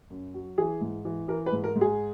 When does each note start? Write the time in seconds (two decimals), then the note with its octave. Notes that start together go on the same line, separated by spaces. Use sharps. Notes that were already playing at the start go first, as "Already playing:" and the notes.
0.10 F#2
0.34 F#3
0.58 E3 G#4
0.81 G#2
1.05 E3
1.28 E3 A#4
1.46 B4
1.52 G#2
1.64 A#4
1.76 G#2
1.81 G#4